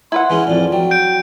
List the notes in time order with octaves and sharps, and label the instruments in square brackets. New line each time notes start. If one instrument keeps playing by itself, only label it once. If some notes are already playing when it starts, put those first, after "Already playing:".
[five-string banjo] E4 B4 F#5 [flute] C6
[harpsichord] E3 G#3 C#4
[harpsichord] F2 A2 [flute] D5
[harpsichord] F#3 [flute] G5
[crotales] G6 D7